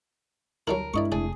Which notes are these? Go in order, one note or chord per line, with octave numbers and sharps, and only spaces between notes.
D2 F#3 G3 E4 A#4
G2 G#3 D4 E4 D5 D#5 C#6
F1 G#4 D5